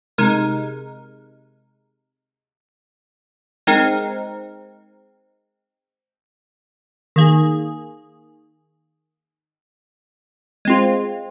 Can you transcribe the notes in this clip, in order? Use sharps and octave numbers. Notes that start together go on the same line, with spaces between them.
C3 G#3 D#4 A#4
G#3 C4 D#4 A#4
D#3 A#3 G#4
G#3 C4 F4